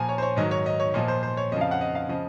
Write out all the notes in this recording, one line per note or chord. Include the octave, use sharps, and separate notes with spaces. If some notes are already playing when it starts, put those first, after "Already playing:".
Already playing: A#2 F3 G#5 A#5
C#5
C5
C#5
G#2 D#3 F#3 D#5
C#5
D#5
C#5
A#2 F3 D#5
C5
C5
C#5
F2 C#3 F3 D#5
F5
F#5
D#5
F5
C#3 F3 D#5